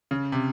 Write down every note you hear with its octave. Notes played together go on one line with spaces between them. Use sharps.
C#3
C3